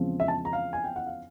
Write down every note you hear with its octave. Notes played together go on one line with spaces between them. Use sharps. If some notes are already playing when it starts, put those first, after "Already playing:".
Already playing: E2 C#3 F3 G#3 C4
E5
A5
A#5
F5
G#5
G5
F#5
F5